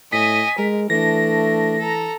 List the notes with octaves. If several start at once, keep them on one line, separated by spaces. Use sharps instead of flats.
A2 D#5 G#5 B6
G#3 A#4
E3 A3 D4 A#6
A4 A#5